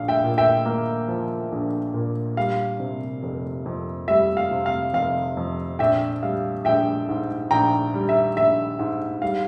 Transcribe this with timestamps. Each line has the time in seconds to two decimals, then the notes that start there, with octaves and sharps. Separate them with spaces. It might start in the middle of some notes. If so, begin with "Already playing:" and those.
Already playing: A#1 F5
0.08 E5 G5
0.24 A#2
0.38 E5 G5
0.65 A#3
1.08 F3
1.52 A#1
1.94 A#2
2.37 G3 F5
2.80 C3
3.23 F1
3.66 F2
4.08 G3 E5
4.37 F5
4.51 C3
4.66 F5
4.93 F1 F5
5.37 F2
5.79 A#1 E5 G5
6.23 G3 F5
6.65 A#1 E5 G5
7.09 G#2
7.51 A#1 G5 A#5
7.94 G3
8.09 E5
8.37 A#1 E5
8.79 G#2
9.22 G3 F5